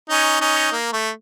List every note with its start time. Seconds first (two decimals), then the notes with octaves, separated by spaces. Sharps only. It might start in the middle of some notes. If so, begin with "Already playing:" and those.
0.09 C#4 D#4
0.40 C#4 D#4
0.72 A#3
0.92 A3